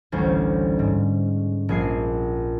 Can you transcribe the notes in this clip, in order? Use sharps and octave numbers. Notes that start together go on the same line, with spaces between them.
A1 D2 G3 C#4 C5
G#2
A#1 G#4 C7